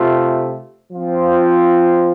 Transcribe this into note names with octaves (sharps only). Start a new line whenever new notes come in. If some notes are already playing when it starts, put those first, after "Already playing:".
Already playing: C3 A3 F4
F3 C4 F4